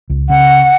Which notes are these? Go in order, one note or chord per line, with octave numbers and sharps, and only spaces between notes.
C#2
C#3 F#5